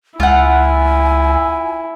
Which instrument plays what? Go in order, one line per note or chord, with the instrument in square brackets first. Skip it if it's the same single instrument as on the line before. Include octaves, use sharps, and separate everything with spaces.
[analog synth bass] C#2 [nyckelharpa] E4 [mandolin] F4 F#5 [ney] G#5